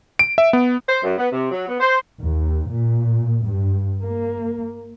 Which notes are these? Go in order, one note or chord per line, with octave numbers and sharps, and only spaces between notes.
D7
E5
B3
C5
F#2
B3
C3
F#3
B3
C5
D#2
A#2
G2
A#3